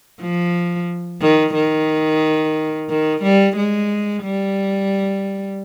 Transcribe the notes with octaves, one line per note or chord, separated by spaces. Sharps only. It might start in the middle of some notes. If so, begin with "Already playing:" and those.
F3
D#3
D#3
D#3
G3
G#3
G3